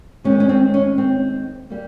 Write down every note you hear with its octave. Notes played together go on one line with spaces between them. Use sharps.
D#3 G#3 C4 C#4
C#4
C4
C#4
C4
G3 A#3